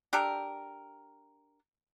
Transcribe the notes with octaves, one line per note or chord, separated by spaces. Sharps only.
D4 G4 A4 A#4